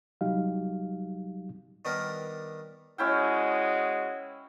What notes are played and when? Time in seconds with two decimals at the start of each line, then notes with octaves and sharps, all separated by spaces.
0.21 C2 F#3 G3 D#4 G4 F5
1.85 D#3 G3 B3 D4 A#4
2.98 G#3 C#4 E4 F#4 D#5 G5